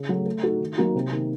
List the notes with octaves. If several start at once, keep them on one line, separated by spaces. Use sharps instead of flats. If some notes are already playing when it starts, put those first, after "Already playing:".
Already playing: C#3
F#3 A3
A3
D#4 F#4 A4
D#3
F#3 A#3 D#4 F#4
C3
D#3 A#3